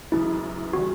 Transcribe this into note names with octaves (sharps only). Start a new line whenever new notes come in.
F#2 C#3 E3 G#3 E4
C#3 E3 G3 F#4